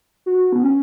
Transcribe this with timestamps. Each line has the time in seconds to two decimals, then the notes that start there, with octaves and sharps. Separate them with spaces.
0.26 F#4
0.52 B3
0.63 C#4